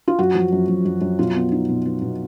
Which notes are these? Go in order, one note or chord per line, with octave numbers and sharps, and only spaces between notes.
F4
F#2 F#4
F3
F#2
F#2
F#2
F#2
B2 F4
B3
D#4
B2
B3
B2